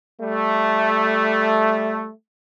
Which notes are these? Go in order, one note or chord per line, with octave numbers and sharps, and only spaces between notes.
G3 A3